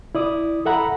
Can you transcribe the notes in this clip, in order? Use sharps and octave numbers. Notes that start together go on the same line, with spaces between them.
E4 D5 D#6
A4 E5 F#5 A#5 B5